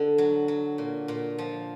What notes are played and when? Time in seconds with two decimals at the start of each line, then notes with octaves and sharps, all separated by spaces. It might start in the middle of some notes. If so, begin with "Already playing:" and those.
Already playing: D3
0.18 F#3
0.48 F#3
0.78 A#2
1.08 A#2
1.38 F3